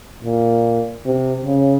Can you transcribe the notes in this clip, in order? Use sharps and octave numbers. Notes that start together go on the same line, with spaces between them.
A#2
C3
C#3